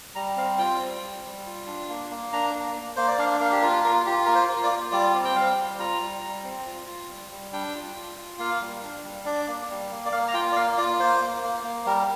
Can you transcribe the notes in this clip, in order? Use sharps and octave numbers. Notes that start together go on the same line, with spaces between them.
G3 A#5
C4 F5
F4 G5
G3
G3
G3
F4
D4
A#3
A#3
D4 A#5
A#3
A#3
A#3 C5
D5
D4 F5
A#3 F5
G4
F4 A#4
F4 A#4
F4 G4
A#3 A#4
C5
F4
D5
F4
G3 D5
C4
G5
G3 F5
G3
F4 A#5
G3
G3
C4
F4
F4
G3
G3
D4 G5
F4
F4
F4
A#3 F5
G3
D4
G3
D4 D5
A#3
G3
A#3
D5
A#3 F5
A#5
F4 G5
D5
A#3 F5
F4 D5
A#3 C5
A#3
A#3
A#3
G3 A#4